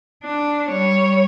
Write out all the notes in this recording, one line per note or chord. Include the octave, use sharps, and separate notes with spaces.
D4
G3 C#5